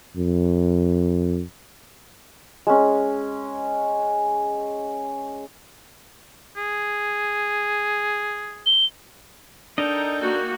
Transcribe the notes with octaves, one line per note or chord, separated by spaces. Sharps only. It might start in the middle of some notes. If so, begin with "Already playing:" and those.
F2
G#3 C#4
G#4
G7
D4 D#4 A4 A#4 D#5 G5
A#3 F#4